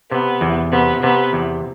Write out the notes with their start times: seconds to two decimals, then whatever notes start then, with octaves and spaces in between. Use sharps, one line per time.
0.11 C3 B3
0.41 E2
0.72 C3 B3
1.03 C3 B3
1.33 E2